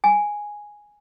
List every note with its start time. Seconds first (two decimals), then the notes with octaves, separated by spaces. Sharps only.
0.04 G#5